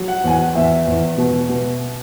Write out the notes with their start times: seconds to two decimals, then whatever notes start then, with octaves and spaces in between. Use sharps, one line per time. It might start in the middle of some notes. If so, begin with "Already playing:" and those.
Already playing: F#3
0.08 F#5
0.24 E2 G#5
0.31 F#5
0.55 E2 E5
0.87 E2
1.18 B2
1.49 B2